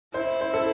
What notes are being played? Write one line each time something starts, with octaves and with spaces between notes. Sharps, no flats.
E4 C5
C5
A4